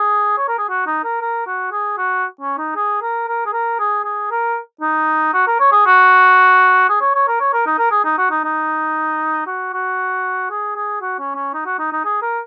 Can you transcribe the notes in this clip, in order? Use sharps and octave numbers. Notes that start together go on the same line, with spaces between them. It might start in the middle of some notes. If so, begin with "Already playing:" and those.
Already playing: G#4
C#5
A#4
G#4
F#4
D#4
A#4
A#4
F#4
G#4
F#4
C#4
D#4
G#4
A#4
A#4
G#4
A#4
G#4
G#4
A#4
D#4
F#4
A#4
C#5
G#4
F#4
G#4
C#5
C#5
A#4
C#5
A#4
D#4
A#4
G#4
D#4
F#4
D#4
D#4
F#4
F#4
G#4
G#4
F#4
C#4
C#4
D#4
F#4
D#4
D#4
G#4
A#4